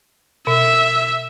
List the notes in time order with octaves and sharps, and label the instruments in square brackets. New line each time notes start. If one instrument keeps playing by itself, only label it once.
[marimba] B2 [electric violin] E5